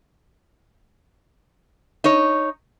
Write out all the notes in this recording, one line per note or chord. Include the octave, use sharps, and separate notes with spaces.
D#4 C#5